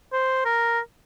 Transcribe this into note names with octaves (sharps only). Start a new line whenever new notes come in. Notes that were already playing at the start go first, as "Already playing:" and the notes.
C5
A#4